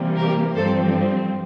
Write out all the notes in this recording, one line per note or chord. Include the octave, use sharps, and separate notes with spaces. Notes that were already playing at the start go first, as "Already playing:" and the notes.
Already playing: C3 E3 G3 A#3
G4 A#4
G2 F3 C4 A4 C5